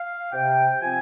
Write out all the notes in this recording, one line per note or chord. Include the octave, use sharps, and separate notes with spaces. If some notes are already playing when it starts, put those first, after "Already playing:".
Already playing: F5
C3 G5
F3 C4 G#5